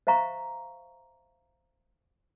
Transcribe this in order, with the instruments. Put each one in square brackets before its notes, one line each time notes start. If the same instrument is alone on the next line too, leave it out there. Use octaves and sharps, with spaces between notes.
[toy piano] C5 E5 F5 A#5 C#6